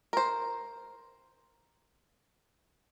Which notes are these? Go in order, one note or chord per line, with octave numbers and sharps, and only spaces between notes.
A#4 C5